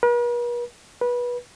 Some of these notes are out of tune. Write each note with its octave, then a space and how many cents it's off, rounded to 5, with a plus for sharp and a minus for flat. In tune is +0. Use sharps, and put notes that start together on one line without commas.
B4 -45
B4 -20